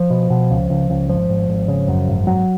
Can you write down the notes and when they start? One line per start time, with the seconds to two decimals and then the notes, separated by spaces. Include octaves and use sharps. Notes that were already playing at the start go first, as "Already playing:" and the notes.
Already playing: F3
0.10 B2
0.30 B2
0.51 C#2
0.70 C#2
0.90 C#2
1.09 G#1 F3
1.29 G#1
1.49 G#1
1.68 C#3
1.88 F#2
2.07 G#1
2.27 G#1 F#3